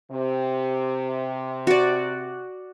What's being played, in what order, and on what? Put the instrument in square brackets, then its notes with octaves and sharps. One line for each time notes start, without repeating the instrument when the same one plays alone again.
[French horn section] C3
[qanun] F#4 D5